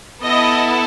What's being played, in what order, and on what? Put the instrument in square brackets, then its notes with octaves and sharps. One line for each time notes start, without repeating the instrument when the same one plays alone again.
[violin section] B3 E4 A4 D#5